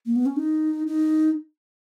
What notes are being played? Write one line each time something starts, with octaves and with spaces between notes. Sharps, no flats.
A#3
B3
C#4
D#4
D#4